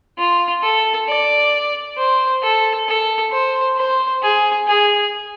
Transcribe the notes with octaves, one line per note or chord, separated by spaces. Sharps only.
F4
A4
D5
C5
A4
A4
C5
C5
G#4
G#4